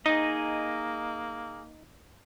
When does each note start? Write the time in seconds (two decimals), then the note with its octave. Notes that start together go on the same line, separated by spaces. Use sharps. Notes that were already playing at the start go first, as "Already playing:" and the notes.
0.06 A#3 D#4 G#4 D#5